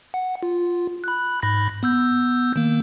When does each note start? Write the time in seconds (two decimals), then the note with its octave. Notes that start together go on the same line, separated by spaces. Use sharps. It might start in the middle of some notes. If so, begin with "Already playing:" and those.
0.14 F#5
0.43 F4
1.04 B5 F#6
1.43 G#2 B5 A#6
1.83 B3 E6 G6
2.56 D#3 A#3